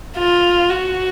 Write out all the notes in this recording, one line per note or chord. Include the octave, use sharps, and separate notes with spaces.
F4
F#4